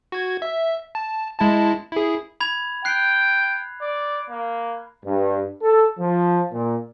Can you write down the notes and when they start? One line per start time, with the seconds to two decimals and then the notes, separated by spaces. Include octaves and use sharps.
0.12 F#4 G#6
0.42 E5
0.95 A5
1.40 G#3 E4 A5
1.92 E4 G#4
2.40 B5 G#6 F7
2.85 G5 F#6 C7
3.81 D5
4.30 A#3
5.06 G2
5.62 A4
5.99 F3
6.52 A#2